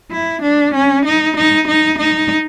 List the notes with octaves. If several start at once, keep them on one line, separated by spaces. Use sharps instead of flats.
E4
D4
C#4
D#4
D#4
D#4
D#4